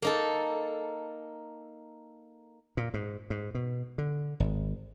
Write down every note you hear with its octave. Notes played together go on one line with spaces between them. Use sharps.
A#3 D#4 A4
A#2
G#2
G#2
B2
D3
G#1